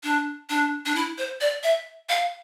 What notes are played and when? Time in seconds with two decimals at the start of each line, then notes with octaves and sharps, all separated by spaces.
0.04 D4
0.50 D4
0.86 D4
0.95 E4
1.18 C5
1.41 D5
1.64 E5
2.09 F5